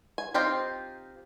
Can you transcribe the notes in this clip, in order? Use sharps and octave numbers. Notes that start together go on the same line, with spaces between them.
G#5
C4 D#4 F4 G4 C5